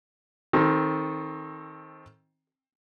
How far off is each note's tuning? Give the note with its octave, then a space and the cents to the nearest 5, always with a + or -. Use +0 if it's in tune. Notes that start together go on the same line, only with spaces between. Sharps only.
D#3 +20 C4 +25 A4 +0